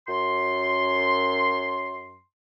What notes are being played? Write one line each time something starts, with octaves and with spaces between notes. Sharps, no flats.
F#2 C6